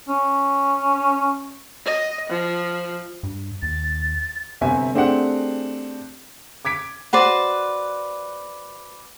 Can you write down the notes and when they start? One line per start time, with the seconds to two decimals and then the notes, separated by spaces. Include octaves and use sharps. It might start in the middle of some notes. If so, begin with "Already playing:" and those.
0.09 C#4
1.86 D#5
2.30 F3
3.23 G2
3.62 D#2 A6
4.61 G1 C3 E5 G#5
4.95 A3 C4 D4 G4 G#4 F#5
6.65 D6 G#6 B6 D7
7.13 F#4 B4 C5 D5